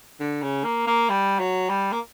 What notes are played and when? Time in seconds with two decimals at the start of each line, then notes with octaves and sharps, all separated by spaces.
0.20 D3
0.42 C#3
0.64 A#3
0.87 A#3
1.10 G3
1.40 F#3
1.70 G3
1.92 A#3